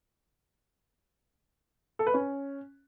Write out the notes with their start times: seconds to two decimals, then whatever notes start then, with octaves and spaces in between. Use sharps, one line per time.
1.99 A4
2.07 B4
2.14 C#4